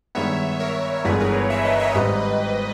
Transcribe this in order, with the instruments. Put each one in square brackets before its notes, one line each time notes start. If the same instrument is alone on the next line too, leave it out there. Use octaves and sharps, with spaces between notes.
[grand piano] G2 D#3 G#3 B3 [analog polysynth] C#5 E5
[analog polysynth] A#4 C#5
[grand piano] G1 G2 E3 G#3 B3 [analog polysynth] G#4 B4
[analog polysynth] A#4 C#5
C#5 E5
B4 D#5
C#5 E5
[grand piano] G#1 G#2 G3 [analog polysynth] B4 D#5